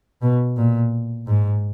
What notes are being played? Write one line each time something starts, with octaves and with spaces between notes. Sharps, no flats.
B2
A#2
G#2